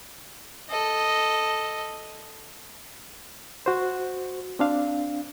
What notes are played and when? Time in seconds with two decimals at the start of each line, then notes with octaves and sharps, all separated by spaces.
0.69 A4 D#5
3.66 F#4 C5
4.59 C4 D4 F5